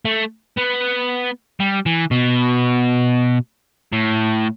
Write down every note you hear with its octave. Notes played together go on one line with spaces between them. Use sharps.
A3
B3
G3
E3
B2
A2